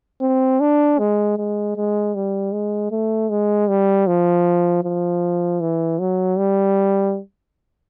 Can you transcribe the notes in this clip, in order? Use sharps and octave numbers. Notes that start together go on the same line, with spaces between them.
C4
D4
G#3
G#3
G#3
G3
G#3
A3
G#3
G3
F3
F3
E3
F#3
G3